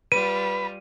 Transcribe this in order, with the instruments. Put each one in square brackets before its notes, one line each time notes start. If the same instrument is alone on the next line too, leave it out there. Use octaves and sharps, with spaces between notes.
[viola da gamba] G3 F4 [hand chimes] B4 [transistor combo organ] B5 [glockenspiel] D#7